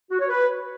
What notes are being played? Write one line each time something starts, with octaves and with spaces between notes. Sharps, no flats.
F#4
C#5
B4